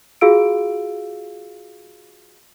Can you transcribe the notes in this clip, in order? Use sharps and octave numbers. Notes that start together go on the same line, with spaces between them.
F4 F#4 G#4 F5 E6 D7